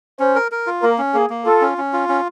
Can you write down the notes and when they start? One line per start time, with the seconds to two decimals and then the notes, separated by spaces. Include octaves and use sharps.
0.20 C#4 C5
0.36 A#4
0.52 A#4
0.67 F4
0.82 A#3 A#4
0.98 C#4
1.14 A#3 G#4
1.30 A#3
1.45 F4 A4
1.61 C#4
1.78 C#4
1.93 F4
2.09 C#4